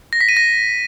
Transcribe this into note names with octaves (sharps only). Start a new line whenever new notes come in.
A#6
B6
D#7
A#6